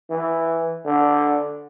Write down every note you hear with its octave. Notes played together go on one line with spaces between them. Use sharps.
E3
D3